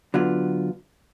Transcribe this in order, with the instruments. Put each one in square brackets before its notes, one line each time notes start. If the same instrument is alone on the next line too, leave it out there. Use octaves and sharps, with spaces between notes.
[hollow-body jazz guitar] D3 F#3 B3 F4